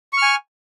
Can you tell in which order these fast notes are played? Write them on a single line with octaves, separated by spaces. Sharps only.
C#6 F6 G#5